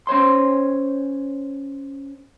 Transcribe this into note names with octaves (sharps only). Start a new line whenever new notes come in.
C#4 C5 C#5 C6